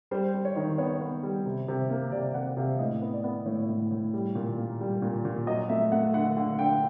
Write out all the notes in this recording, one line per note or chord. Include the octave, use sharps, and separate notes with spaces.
G3 C5
G3
C#5
D#3
B3 C#5
B3
G3
C3
C3
A#3
C3 D5
C3 F#5
C3 F5
A2 D#5
B3
D5
B3
A2 C#5
A2
A2
G3
A#2
A#3
G3
A#2
A#2
F#3 D#5
A3 E5
A3 F#5
D3 F#5
D3
D3 G5